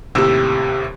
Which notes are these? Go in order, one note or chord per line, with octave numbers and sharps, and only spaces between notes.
D#2 A2 C3 G4 E6